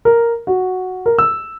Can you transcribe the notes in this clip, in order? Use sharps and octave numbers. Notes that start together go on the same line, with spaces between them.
A#4
F#4
A#4
E6